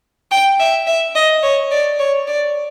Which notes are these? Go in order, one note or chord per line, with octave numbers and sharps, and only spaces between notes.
G5
E5
E5
D#5
C#5
D5
C#5
D5